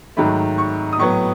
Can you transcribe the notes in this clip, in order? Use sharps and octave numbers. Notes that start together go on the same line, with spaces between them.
G#2 D#3 F#3 A3 B5
C#6
D#6
A2 F#3 B3 C#6